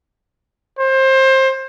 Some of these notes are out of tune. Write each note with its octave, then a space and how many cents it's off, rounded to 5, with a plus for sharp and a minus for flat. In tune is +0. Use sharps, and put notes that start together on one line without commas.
C5 +25